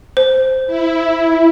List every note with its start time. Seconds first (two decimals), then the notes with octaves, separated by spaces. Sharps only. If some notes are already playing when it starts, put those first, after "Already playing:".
0.17 C5
0.67 E4